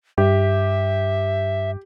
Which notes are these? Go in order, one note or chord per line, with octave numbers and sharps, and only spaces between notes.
G2 G4 E5